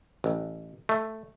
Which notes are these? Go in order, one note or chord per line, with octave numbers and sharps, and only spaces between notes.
A1
A3